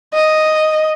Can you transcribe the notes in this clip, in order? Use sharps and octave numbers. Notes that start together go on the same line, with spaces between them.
D#5